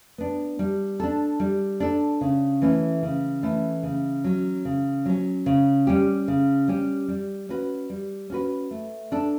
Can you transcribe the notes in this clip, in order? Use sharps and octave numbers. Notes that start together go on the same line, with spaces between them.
B3 D4
G3
D4 A4
G3
D4 A4
C#3
E3 A3 C#4 E4
C#3
E3 A3 C#4 E4
C#3
F#3 C#4
C#3
F#3 C#4
C#3
G3 C#4 G4
C#3
G3 C#4 G4
G3
C#4 F#4 B4
G3
C#4 F#4 B4
A3
D4 A4